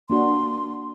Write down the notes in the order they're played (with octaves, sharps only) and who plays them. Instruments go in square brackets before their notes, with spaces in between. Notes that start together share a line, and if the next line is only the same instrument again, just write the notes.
[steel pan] A#3 D4 F#4 [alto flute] C6